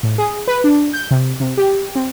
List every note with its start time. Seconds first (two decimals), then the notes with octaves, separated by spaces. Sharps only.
0.03 A2
0.18 G#4
0.48 B4
0.64 D4
0.93 G6
1.11 C3
1.40 C3
1.57 G4
1.95 C4